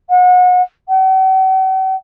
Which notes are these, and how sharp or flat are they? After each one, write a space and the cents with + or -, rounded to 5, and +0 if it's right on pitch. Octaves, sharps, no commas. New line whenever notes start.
F#5 -30
F#5 +45